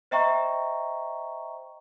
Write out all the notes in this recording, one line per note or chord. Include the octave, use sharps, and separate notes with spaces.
C5 D#5 E5 G5 A#5 C#6